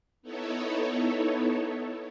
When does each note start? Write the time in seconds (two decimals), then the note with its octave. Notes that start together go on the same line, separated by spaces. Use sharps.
0.22 B3 D#4 E4 A4 C#5